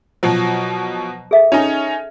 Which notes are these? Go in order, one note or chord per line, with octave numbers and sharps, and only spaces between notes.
B2 F3 F#3 C5
G#4 A4 E5
C#4 D#4 A5